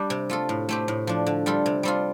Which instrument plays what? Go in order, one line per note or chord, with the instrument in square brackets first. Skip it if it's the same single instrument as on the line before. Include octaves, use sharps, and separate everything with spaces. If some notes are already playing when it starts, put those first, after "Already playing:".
Already playing: [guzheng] G3 D4 G4
C3
A3 F4 A4
A2
A3 C4 G4
A2
F3 D4
D3
G3 F4 A4
C3
G3 C4 F4 A4